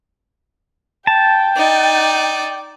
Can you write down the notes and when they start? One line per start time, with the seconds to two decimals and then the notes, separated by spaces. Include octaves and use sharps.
1.07 G5 A5
1.57 D#4 D5